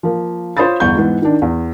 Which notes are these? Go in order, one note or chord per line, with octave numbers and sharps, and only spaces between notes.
F3 A#3
F4 C5 C#5 B5 D#6 A6
G1 E2 C#6 G6
G#2 E3 B3
D#3 D4
E2